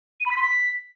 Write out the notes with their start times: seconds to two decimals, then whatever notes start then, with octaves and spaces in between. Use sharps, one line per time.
0.20 D#7
0.26 B5
0.31 B6
0.37 C6
0.42 B6